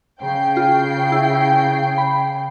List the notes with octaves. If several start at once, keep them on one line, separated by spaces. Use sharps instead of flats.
C#3 G5 C7
F4
E4
B5